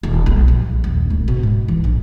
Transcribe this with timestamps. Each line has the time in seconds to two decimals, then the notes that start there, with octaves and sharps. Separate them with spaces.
0.03 D#1
0.26 B1
0.48 A#1
0.84 D#1
1.10 D1
1.28 B2
1.43 G#2
1.68 E3
1.84 A#1